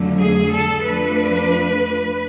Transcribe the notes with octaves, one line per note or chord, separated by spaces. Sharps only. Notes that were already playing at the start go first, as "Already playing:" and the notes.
Already playing: F2 D3 F#3 A3
G#4
A4
F2 F3 A3 D4 B4